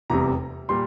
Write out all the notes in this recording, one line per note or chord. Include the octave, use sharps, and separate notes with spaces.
F1 E2 C3 G3 A#5
A#2 G3 C6